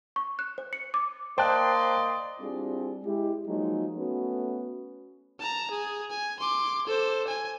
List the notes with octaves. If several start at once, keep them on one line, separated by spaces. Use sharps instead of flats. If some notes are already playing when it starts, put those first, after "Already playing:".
C#6
F#6
C5
C#7
D6
A#3 C5 D5 D#5 G5 A5 C6 F#6
G3 C4 D4 E4 F4 G#4
G#3 E4 G4
F3 F#3 G#3 A#3 D#4
A3 B3 C#4 F#4
A5 A#5
G#4
G#5
C6 D6
A4 C5
G#5